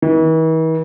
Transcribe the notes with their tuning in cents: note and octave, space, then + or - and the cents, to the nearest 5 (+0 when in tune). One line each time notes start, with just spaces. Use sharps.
E3 -45